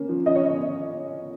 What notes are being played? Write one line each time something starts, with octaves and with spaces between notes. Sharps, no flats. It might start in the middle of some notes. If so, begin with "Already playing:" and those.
Already playing: A#3 C#4
F3
C#4 D#5
C#5
C#4 D#5